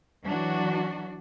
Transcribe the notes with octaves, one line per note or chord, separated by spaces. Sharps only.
E3 F#3 D4 F#4